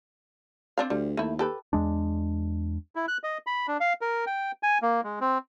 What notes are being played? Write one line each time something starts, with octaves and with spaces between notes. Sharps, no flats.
C4 D4 F5
D2 G3
D#2 A3 E4
G4 A4 B4
E2 G#3 D4
E4
F#6
D#5
B5
D4
F5
A#4
G5
G#5
A#3
G#3
C4